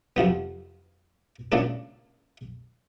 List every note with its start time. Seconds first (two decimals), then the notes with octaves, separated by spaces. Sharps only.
0.16 F2 C3 F3 B3
1.52 A#2 C#3 A3 A#3 D4 A4